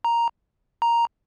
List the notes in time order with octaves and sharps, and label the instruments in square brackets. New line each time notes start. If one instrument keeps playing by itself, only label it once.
[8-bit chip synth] A#5
A#5